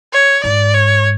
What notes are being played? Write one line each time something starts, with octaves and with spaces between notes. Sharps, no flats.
C#5
G#2 D5
C#5